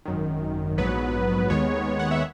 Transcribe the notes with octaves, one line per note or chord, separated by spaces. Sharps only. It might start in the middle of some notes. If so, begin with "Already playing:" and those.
G#1 F#2 D#3
A#1 G#2 F#3 B3 B4
D#2 D#3 G#3 B3 C#5
F#5
E5